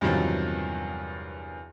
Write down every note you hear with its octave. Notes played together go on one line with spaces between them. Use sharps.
E2 G2 C3 D#3 F3 F#3